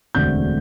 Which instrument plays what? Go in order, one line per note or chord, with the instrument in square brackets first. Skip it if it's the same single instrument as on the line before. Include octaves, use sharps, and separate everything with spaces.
[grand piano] E1 D2 D3 A3 C4 G6